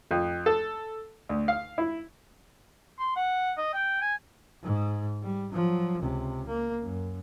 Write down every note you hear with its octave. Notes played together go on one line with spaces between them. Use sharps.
F2
A4
D2
F5
E4
C6
F#5
D#5
G5
G#5
G#2
G3
F3 F#3
C#2 C3
A#3
F#2